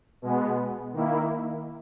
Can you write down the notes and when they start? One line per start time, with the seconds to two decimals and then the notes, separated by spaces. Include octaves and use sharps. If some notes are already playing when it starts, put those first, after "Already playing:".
0.22 B2 G#3 B3
0.93 D#3 A#3 E4